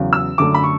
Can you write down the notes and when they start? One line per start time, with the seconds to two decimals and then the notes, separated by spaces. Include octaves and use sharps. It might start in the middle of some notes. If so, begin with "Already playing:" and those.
Already playing: E2 C#3 F#3
0.13 E6
0.38 F#2 D3 A3 D6
0.54 B5
0.63 C#6